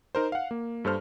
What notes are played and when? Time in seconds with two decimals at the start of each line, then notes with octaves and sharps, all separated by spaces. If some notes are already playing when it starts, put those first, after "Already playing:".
0.15 D#4 A#4 C5
0.32 F5 F#5
0.51 A#3
0.85 G2 A4 C5 F6